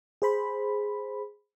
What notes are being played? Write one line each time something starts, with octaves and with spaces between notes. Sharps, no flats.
G#4 C5 B5